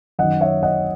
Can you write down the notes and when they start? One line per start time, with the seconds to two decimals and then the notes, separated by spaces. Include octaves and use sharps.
0.19 F#2 D#3 D#5 F#5
0.41 C#5 E5
0.63 D#5 F#5